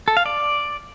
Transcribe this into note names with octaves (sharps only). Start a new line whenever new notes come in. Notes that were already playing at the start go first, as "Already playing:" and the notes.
A4
F5
D5